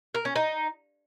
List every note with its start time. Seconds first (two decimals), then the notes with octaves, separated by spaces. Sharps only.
0.15 A#4
0.25 C#4
0.36 D#4